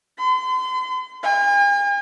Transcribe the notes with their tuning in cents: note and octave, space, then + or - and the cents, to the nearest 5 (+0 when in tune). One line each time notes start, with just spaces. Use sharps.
C6 -40
G#5 -45